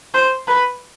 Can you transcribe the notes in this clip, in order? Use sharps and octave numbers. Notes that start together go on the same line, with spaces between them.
C5
B4